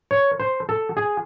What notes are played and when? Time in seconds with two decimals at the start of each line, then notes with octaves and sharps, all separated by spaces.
0.11 C#5
0.40 C5
0.69 A4
0.97 G#4